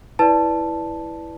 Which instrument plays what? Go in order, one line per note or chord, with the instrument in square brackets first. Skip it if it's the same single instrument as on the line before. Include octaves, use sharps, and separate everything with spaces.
[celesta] E4 B4 D5 A5